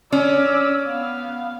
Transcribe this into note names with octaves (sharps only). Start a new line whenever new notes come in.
C#4 D5 E6
B3 F5